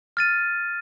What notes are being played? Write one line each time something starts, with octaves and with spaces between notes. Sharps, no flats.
F6 A6 D#7